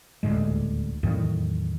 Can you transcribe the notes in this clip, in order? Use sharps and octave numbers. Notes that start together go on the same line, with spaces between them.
D#1 D2 A2 G#3
E2 A2 D#3 F#3